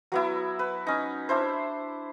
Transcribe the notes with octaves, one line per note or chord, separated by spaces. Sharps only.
F#3 B3 E4
B4
C#4 D#4
D4 E4 C5